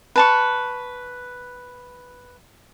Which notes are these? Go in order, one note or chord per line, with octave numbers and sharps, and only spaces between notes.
B4 A5 C#6